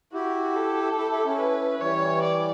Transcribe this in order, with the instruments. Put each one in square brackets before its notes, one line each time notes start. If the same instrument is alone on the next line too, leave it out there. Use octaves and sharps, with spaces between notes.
[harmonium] E4 G4 [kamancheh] F#4
[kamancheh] A4
[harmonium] E4 G4
E4 G4
C#4 E4
[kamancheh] B4
[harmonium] E3 G3 [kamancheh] C#5
[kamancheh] D5